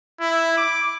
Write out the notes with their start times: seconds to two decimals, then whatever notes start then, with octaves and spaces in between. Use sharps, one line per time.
0.20 E4
0.57 D6